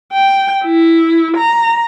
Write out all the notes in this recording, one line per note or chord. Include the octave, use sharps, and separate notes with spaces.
G5
E4
A#5